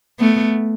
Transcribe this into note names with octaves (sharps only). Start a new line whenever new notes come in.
A3 B3